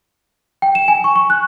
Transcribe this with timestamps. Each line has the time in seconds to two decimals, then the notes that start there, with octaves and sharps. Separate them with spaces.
0.62 G5
0.75 E7
0.88 G#5
1.04 C#6
1.16 C#6
1.30 F#6